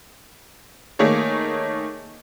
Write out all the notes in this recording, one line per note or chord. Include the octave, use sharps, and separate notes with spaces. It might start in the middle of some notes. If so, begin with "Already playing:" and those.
D#3 A3 A#3 G#4 C#5